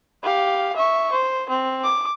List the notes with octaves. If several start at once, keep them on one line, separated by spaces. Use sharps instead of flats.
G4 F5
E5 C#6
C5
C4
D6